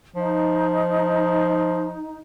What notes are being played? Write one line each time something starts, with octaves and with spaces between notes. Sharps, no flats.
F3 D#4